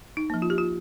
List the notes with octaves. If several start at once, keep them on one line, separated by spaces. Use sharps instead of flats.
D#4
F3 A#3
F4
G4
F4